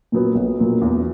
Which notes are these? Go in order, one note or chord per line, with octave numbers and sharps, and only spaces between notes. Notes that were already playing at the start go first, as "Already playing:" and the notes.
A#2 F#3 B3
B1
A#2 F#3 B3
E2